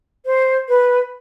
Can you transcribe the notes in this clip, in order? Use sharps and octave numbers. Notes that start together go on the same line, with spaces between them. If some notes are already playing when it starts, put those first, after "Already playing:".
C5
B4